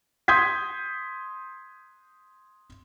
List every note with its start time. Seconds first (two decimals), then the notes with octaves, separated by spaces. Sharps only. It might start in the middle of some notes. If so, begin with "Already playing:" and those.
0.28 C6 D#6 G6 G#6 B6